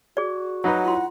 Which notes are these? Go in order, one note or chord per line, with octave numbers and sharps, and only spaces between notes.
F#4 G#4 D5
F#3 D#4 B4 F#5
E4 F4 C6